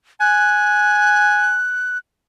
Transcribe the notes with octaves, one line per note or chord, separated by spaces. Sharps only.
G#5 F#6